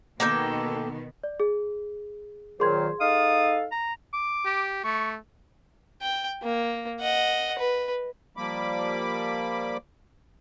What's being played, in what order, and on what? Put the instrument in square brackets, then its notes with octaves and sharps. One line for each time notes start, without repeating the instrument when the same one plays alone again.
[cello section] B2 D#3 B3 [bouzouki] A#3 A4 G5
[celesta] D5
G#4
[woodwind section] A#2 D#3 F#3 [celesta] G#4 C6 G#6 [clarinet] C5
[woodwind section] D#4 A4 F5 [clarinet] D#6
[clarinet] A#5
[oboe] D6
[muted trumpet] G4
[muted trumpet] A3 [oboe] C#6
[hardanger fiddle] G5
A#3
D#5 F#5
B4
[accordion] F3 G3 A#3 B5 D6